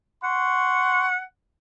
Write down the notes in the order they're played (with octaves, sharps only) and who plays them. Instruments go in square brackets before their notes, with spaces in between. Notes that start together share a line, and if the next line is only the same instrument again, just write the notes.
[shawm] F#5 [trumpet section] C6 C#6